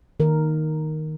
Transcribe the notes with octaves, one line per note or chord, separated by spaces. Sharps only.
D#3 A#4